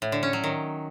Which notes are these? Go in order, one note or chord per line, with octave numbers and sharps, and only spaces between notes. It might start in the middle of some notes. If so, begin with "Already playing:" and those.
A2
D3
C#4
F#3
D#3